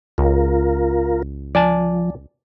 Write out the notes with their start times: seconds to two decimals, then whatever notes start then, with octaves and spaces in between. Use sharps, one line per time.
0.18 C#2 F4 A#4
1.55 F3 D5 G#5 A5